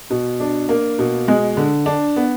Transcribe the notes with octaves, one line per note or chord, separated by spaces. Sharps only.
B2
D4
A#3
B2
G#3
D3
D4
B3